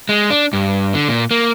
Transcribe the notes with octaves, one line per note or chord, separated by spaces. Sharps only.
G#3
D4
G2
D3
A#2
A#3